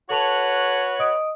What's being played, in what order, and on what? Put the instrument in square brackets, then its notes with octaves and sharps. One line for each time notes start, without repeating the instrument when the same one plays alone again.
[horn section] F#4 B4 C#5 [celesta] A4 A5 F7
[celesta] D#5 D#6 D7